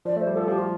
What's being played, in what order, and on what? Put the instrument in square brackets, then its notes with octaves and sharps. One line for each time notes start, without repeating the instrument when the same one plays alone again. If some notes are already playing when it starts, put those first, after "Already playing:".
[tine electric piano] F3 [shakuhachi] D5
[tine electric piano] A3 [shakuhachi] C5
[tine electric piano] G3
[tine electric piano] F3 [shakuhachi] A4
[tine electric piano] F3 [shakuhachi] G4
[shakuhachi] F4